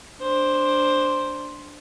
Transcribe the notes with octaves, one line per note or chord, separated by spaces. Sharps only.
D4 C5